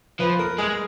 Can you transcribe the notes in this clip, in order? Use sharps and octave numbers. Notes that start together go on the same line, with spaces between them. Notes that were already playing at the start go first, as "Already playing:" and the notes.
F3 B4
A#4
G#3 G#4